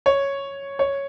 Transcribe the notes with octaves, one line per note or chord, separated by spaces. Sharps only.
C#5
C#5